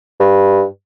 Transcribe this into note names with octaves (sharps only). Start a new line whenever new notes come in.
G2